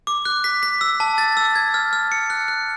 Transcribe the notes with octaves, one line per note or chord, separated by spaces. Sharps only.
D6
F#6
B6
B6
E6
A5
A6
E6
G#6
F6
F6
C#7
F#6
F#6